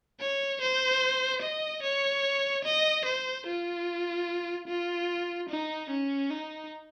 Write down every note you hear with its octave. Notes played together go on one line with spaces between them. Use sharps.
C#5
C5
D#5
C#5
D#5
C5
F4
F4
D#4
C#4
D#4